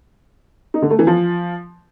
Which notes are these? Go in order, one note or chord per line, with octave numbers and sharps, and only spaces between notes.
D#4
D3
A3
E3
F3